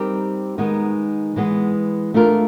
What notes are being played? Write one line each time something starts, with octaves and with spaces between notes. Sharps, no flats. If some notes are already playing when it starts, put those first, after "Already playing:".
Already playing: G3 C4 D#4 G4 A#4
D#3 G#3 B3 D#4
E3 G#3 B3
A3 D4 F4 A#4